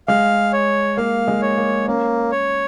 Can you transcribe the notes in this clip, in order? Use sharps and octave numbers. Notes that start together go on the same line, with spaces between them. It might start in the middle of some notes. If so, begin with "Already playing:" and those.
G#3 F5
C#5
A#3 F5
G#3
C#5
A#3
A#3 C#4
C#5